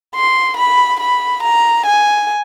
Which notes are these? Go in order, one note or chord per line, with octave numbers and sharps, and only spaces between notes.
C6
B5
B5
A#5
G#5